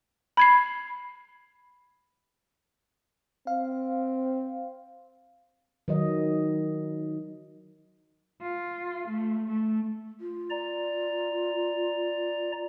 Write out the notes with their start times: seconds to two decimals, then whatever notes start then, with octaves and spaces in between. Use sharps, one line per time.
0.37 B5 G#6 C7
3.47 C4 F5
5.88 D#3 F#3 D#5
8.42 F4
9.08 A3
9.48 A3
10.21 F4
10.50 D5 A#5